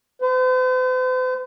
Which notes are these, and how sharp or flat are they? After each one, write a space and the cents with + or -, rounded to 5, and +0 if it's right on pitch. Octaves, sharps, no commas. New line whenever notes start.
C5 -45